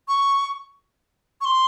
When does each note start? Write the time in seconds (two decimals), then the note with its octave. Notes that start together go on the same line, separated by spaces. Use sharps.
0.08 C#6
1.41 C#6
1.45 C6